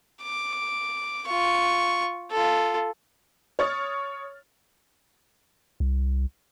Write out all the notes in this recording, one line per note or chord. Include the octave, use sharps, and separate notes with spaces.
D6
F4 C#6
F4 A4
C#5 C#6 D#6 F6 A6
C2